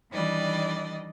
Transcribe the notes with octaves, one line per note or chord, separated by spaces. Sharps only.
D#3 E3 G3 D4 D5 D#5